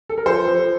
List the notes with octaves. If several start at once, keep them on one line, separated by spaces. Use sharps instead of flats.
A4
A#4
F3 A4 C5
F3